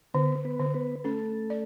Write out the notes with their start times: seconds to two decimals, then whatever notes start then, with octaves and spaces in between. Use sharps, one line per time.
0.14 D3 B3 B4
0.45 B3 B4
0.59 D3
0.74 B3 B4
1.04 A3 C#4 A4
1.50 D5